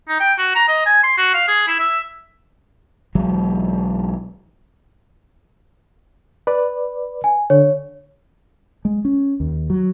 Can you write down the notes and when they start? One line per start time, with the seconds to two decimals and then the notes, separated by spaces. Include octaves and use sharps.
0.09 D#4
0.20 G5
0.38 F#4
0.55 A#5
0.68 D#5
0.86 G#5
1.03 C6
1.18 F#4
1.34 F5
1.48 G#4
1.68 E4
1.79 E5
3.15 B1 E3 F#3 G#3
6.47 B4 D5
7.24 G#5
7.50 D3 C#5
8.85 G#3
9.05 C#4
9.40 D#2
9.70 F#3